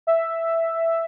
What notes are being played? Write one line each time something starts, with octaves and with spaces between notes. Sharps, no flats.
E5